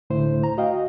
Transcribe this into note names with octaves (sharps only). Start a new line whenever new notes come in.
C#2 A2 D3 A3 E4 C5
A#5
F#4 D#5 F5 G5